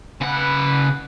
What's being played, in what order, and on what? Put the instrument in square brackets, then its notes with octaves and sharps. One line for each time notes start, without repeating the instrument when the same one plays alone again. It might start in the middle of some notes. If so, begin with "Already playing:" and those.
[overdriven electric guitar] C#3 F#5 [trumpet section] B4